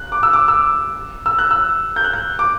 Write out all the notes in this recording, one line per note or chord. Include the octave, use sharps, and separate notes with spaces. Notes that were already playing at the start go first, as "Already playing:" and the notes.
Already playing: F#6
D6
E6
D6
E6
E6
F#6
E6
G6
F#6
G6
D6